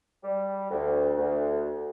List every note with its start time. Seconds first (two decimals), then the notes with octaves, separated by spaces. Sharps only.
0.24 G3
0.70 D2
1.18 D2